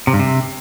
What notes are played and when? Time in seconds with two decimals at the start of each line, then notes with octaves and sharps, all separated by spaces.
0.07 C3
0.13 G2
0.19 C3